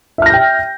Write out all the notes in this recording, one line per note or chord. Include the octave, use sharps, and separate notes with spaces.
E5 G5 F6 G6 A#6